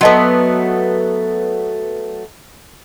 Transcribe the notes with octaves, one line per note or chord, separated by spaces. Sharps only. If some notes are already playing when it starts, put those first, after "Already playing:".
F#3 A3 B3 F#4 D#5 A5